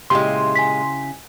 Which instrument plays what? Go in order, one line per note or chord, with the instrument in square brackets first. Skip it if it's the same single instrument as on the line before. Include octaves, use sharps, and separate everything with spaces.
[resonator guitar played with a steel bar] A#2 G#3 [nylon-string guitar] C#3 E4 G4 [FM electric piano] C6
[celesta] G#5 B6